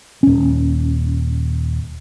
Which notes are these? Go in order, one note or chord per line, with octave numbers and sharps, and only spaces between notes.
D#1 C#4